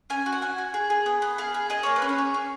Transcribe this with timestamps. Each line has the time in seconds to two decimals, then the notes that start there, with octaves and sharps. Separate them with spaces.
0.10 C#4 G#5
0.26 F#4
0.33 F#5
0.42 C#4 G#5
0.58 F#4
0.74 G#4
0.90 G#4
1.06 B3
1.22 B3
1.38 G#4 F5
1.54 G#4
1.70 G#4 D#5
1.83 A#3 C#5
1.96 B4
2.02 C#4
2.09 C#5
2.18 G#4
2.34 C#4